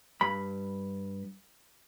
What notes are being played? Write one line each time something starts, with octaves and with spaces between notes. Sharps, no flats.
G2 B5